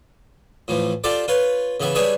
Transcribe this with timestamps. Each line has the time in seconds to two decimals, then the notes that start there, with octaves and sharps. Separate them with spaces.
0.68 A2 E3 F3
1.04 F4 G4 A4 C5 D5
1.28 F4 B4 C#5
1.80 C#3 E3 B3 E5
1.95 G3 D4 G#4 B4 C#5 E5